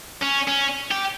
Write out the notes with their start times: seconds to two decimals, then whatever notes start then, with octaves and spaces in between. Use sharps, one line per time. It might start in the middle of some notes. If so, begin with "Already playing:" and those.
0.22 C#4
0.48 C#4
0.91 G4